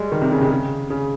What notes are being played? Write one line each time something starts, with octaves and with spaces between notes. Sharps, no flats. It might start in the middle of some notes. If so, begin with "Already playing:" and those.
Already playing: G3 G#3
D#3
C3
C#3
C3
C#3
C#3